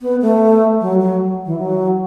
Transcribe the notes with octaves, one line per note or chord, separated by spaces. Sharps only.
B3
A3
F#3
F#3
E3
F#3